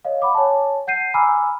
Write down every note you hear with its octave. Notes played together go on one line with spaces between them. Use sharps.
C#5 D#5 F5
F#5 B5 D6
C#5 G#5 A5
F#5 G6 C7 D#7
G#5 A#5 B5 D6 E6 F6